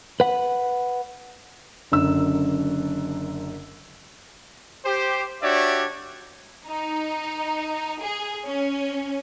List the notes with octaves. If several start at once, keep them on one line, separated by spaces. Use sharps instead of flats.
B4 F#5
F#1 F#2 D3 E6
G4 C5
D4 F#4 G4 C#5 D5 E5
D#4
G#4
C#4